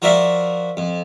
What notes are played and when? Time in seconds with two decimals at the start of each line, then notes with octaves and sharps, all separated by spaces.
0.02 F3 F#4 A#4 D5 E5 F5
0.77 F2